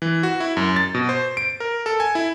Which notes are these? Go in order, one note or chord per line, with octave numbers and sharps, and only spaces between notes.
E3
F#4
E4
F#2
A6
B2
C5
D7
A#4
A4
G#5
E4